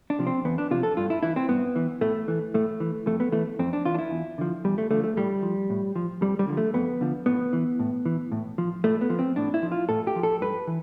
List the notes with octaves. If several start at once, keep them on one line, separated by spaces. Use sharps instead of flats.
D4
C3 F3
C4
E2 B3
D4
C3 F3 F4
A4
G2 F4
E4
E3 E4
C4
G2 B3
E3
A2 A3
E3
A2 A3
E3
F2 A3
B3
E3 A3
F2 C4
D4
E3 F4
D4
E4
E2
D3 F3
E2 G3
A3
D3 F3 A3
A3
A2 G3
F3
A2
F3
F2 G3
G3
D3 F3
A3
F2 B3
D3 F3
A2 B3
E3
A2
E3
A2
F3
A2 A3
B3
F3
C4
A2 D4
E4
F3
F4
A2 A4
G4
F3
A4
G2 B4
E3